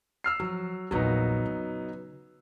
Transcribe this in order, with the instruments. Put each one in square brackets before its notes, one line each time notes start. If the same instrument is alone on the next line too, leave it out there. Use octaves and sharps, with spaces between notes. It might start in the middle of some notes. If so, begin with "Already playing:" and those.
[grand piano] E6 F6 C7
[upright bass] F3 [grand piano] F#3
[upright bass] A#1 E2 [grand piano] F#3 B3 D#4
[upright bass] C#3